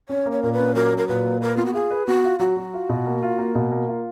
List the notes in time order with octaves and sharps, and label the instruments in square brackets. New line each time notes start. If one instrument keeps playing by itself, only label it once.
[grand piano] C#4 [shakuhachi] C#5
[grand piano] A#3
[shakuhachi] C#5
[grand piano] A#2 [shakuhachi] A#4
[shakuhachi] B4
[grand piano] C#4
[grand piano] F#3 [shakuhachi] A#4
[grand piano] F#3
[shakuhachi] A#4
[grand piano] A#2 [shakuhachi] B4
[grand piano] A#3
[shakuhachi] A#4 [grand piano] B4
[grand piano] B3 [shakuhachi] F4
[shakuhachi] F#4
[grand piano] F4 [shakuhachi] G#4
[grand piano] B4
[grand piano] B3 [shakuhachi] F#4
[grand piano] F4
[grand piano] F#3 [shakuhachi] F#4
[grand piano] F#3
F4
B2
A#3
F4
A#3
B2
A#3
F4